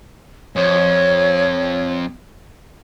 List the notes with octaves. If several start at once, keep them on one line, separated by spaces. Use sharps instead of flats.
F2 C#5